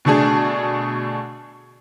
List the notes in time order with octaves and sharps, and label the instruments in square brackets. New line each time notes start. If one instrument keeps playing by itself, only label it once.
[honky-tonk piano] B2 D3 A3 D4 G#4